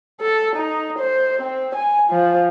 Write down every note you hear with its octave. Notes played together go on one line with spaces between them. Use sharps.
A4
D#4
C5
C4
G#5
F3